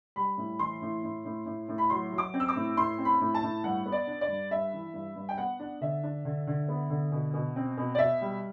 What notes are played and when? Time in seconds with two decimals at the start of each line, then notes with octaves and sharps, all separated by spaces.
0.16 G3 B5
0.37 A2
0.59 E3 C6
0.82 A2
1.03 A2
1.25 A2
1.46 A2
1.69 A2
1.78 B5
1.90 F#3 C6
2.12 F#3
2.18 D6
2.34 C4
2.40 E6
2.48 D6
2.56 A2
2.76 A2 C6
2.98 C4
3.05 B5
3.21 A2
3.35 A5
3.43 A2
3.64 G2 F#5
3.86 B3
3.92 D5
4.07 D4
4.21 D5
4.29 G2
4.51 G2 E5
4.73 E3
4.94 G2
5.16 G2
5.29 G5
5.38 B3 F#5
5.60 D4
5.81 D3 E5
6.03 D4
6.25 D3
6.47 D3
6.68 B3
6.90 D3
7.12 B2
7.34 B2
7.56 C4
7.77 B2
7.95 D5
7.98 B2 E5
8.21 G3